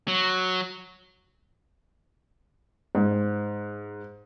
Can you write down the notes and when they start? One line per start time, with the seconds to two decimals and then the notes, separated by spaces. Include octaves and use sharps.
0.08 F#3
2.95 G#2